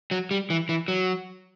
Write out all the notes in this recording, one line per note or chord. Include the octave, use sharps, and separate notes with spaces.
F#3
G3
E3
E3
F#3